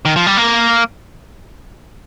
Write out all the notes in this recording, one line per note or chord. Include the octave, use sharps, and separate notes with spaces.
D#3
F3
G3
A#3